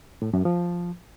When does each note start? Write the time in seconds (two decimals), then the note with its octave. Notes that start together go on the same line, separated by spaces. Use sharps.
0.22 A2
0.33 F#2
0.45 F3